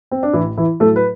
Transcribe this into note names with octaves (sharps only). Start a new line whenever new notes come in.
C4
D4
A1 E3 E4
E3 E4
A2 F#3 A3 A4
B4